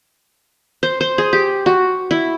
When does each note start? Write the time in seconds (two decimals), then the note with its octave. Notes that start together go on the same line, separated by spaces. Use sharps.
0.83 C5
1.01 C5
1.18 G#4
1.33 G4
1.66 F#4
2.11 E4